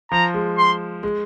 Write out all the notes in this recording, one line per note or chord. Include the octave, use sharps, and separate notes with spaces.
F3 A#5
G#3
C6
G#3